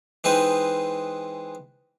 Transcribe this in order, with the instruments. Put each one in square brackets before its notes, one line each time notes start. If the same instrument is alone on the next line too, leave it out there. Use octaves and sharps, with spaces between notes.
[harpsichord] E3 G#3 C4 D#4 B4 C5